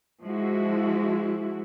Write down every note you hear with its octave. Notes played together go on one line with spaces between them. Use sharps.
F3 G#3 E4 F#4